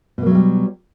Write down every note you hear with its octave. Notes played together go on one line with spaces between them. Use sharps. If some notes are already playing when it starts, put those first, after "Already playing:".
B2 F#3 G3 A3 A#3